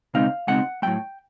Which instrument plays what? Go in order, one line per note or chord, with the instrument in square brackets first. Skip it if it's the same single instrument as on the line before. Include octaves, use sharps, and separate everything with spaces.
[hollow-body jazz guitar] C#2 B2 G#3 C4 D#4 F5
C#2 B2 G#3 C4 D#4 F#5
A2 F#3 A3 G5